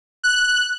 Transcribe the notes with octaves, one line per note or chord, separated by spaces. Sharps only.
F#6